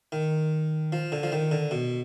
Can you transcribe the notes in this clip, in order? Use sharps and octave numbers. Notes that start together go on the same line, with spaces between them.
D#3
F3
D3
F3
D#3
D3
B2